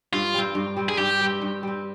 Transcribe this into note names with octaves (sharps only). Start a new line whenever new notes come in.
G2 F4
G3 C4
G2
G3 C4
G#4
G2 G4
G3 C4
G2
G3 C4